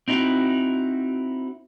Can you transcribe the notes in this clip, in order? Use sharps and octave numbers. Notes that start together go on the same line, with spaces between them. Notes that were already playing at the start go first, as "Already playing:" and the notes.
C4 D#4 E4 F#4